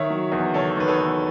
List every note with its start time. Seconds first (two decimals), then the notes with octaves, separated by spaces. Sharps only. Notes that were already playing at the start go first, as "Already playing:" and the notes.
Already playing: D#3 C#5 E5
0.10 F#3
0.32 E2
0.54 D#3 A4 C#5
0.77 D#3 B4
0.88 A4 C#5
1.00 E2